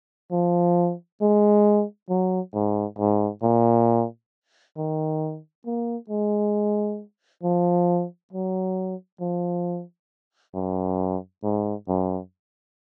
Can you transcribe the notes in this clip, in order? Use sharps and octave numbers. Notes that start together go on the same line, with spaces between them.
F3
G#3
F#3
G#2
G#2
A#2
D#3
A#3
G#3
F3
F#3
F3
F#2
G#2
F#2